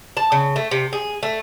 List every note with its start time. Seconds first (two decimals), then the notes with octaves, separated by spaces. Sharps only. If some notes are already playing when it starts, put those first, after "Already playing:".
0.17 A5
0.32 C#3
0.56 A3
0.71 C3
0.93 G#4
1.23 A3